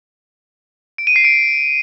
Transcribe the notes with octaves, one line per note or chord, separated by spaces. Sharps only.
D7
D#7
C7
D7